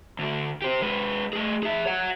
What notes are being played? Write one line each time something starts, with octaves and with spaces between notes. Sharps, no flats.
D2 D3
G4 C5
G#3 B4
A3 G#4
G#4 E5
C#5 F#5